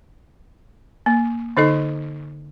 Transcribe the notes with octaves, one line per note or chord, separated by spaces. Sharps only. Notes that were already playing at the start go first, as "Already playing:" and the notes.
A#3
D3 D#4 A4 D#5